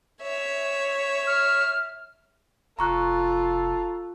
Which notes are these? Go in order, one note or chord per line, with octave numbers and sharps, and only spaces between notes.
C#5 E5
F6
F1 F4 A4 A#5 C#6 F#6